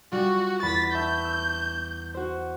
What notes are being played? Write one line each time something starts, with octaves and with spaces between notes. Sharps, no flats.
G3 F4 F#4
E2 B5 A6 B6
E5 A5 C#6 G6
E6
F#4 C5